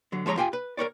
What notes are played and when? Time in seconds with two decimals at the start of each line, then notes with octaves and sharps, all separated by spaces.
0.12 D3 F#3
0.26 F3 G#3 C#5 D5 A#5
0.37 F4 G4 G5 G#5
0.53 B4
0.77 A#4 B4 C#5 D5